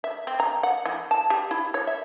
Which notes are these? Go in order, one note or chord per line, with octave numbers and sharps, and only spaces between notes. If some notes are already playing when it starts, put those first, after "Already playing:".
E5
C4
A#5
F#5
E3
A5
G4
E4
C#5
E5